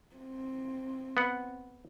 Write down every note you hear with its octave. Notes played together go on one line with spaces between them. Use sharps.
C4
B3 F#5